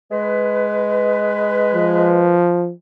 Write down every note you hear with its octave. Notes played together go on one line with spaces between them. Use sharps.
G#3 B4
F3